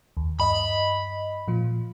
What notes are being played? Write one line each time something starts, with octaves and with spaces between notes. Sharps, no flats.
D#2
G2 D#5 B5
A#2 F3